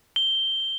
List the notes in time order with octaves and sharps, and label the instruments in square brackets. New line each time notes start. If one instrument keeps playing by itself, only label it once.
[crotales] G7